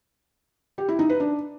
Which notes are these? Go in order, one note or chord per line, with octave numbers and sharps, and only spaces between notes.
G4
E4
D#4
B4
D4